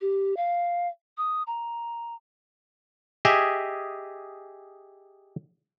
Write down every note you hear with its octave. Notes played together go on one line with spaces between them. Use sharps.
G4
F5
D#6
A#5
G4 G#4 D#5 E5 G#5